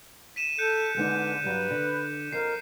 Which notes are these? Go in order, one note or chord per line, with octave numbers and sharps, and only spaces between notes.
B6 D#7 E7
A4 F#6 G6 C#7
D3 G#3 B3 D#4
G2 F#3 G3 B4
D3
F2 A#4 C7